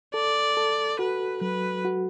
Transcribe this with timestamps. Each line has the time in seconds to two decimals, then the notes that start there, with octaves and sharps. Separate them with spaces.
0.14 A4 D5
0.57 A4
0.99 F#4 B4
1.41 F#3 B4
1.85 F#4